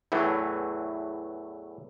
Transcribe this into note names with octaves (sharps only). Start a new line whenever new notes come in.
E2 A2 E3 F#3 A3